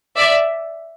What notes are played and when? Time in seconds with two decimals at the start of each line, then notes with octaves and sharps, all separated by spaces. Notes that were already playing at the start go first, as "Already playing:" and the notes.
0.16 D5 E5